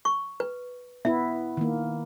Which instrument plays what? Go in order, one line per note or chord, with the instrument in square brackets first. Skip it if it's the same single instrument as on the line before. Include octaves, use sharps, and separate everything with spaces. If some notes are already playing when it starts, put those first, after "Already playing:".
[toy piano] C#6
B4
[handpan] B3 E4 [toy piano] E5
[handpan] D#3 A#3